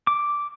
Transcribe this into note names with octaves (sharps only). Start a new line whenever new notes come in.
D6